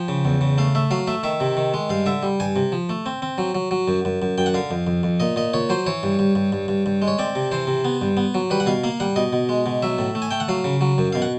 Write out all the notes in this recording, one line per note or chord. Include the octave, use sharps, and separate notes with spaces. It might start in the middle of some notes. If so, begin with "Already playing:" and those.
Already playing: F3 G5
C#3
E2
C#3
A3 F5
A3 E5
F#3 F5
A3 E5
D#3 E5
C3
D#3
G#3
G2 F5
D3 E5
G3
G2 G#5
C3
F3
A3
C4
C4
F#3
F#3
F#3
F#2
F#2
F#2
F#2 G5
F#5
D3 F5
F2
F2
F2
A#2 D#5
A#2 D#5
A#2 C#5
F#3 C5
E3 C#5
G2
G2
G2
G2
G2
G2
G#3
C#5
C4 D5
C3
E3 C5
C3
B3
G2
B3
F#3
G3 B4
F#5
B2 F5
A#3 F5
G3 F#5
B2 D#5
B2
G#3
B2
F#3 E5
A2
A3
G#5
A3 G5
F#5
F#3 F5
C#3
F#3
F#2
B2 F5
F#5